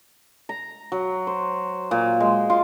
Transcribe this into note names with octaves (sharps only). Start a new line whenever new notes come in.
A#5
F#3
C5
A#2
G#3
F4